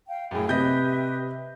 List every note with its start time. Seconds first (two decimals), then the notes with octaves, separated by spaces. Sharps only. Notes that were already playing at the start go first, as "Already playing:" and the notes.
0.06 F5 G5
0.31 F#2 A2 G#4 G5
0.49 C3 G4 B4 D#5 E5 B5 G6